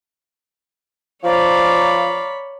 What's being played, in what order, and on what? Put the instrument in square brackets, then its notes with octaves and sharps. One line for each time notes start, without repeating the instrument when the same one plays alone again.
[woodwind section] F3 [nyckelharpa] C#5 B5 [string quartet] D5 F5 A#5